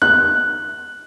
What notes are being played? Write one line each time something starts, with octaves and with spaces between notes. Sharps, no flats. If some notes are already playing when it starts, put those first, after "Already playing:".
F#6